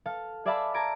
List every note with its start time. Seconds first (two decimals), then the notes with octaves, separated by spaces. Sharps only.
0.06 A4 F5
0.45 G#4 D5 E5 F5 A5 B5
0.74 A5 A#5 G#6 D7